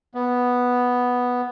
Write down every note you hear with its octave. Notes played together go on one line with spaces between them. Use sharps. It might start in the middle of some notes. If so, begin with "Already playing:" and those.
B3